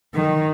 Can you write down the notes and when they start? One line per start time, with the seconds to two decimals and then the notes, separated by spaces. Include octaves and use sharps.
0.15 D#3